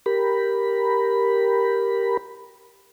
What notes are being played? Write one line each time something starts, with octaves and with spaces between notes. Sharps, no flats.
G4 A#4 B5